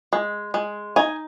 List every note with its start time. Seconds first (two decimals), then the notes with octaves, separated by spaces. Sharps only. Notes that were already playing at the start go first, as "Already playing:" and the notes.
0.13 G#3
0.54 G#3
0.96 D#4 G#5